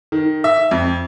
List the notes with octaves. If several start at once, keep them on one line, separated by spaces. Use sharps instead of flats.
D#3
E5
F2